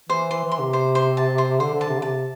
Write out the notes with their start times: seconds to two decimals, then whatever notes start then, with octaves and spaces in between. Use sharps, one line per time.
0.09 E3 C5
0.31 E3 C6
0.45 E3
0.52 C6
0.59 C3
0.73 C5
0.95 C5
1.17 A5
1.38 C5
1.60 D3 C5
1.74 D3
1.81 A5
1.89 C3
1.98 D3
2.02 C3 A5